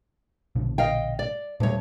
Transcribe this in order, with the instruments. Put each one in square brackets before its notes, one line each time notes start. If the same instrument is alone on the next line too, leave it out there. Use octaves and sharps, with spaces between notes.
[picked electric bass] A#1 B2 D3
[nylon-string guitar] D#5 F5 G5
D5
[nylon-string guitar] D2 C#5 [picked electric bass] A#2 G3